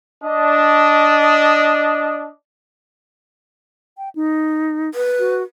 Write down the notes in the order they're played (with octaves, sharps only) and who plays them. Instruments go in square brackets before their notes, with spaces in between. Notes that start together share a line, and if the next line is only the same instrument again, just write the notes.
[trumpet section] D4 D#5
[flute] G5
D#4
[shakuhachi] B4
[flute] F#4